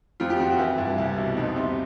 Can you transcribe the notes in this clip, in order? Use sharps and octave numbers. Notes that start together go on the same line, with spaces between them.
F2 F4
G4
F2 F#4
F#4
E3 E4
G2
C2
B2
F2 D#4
C3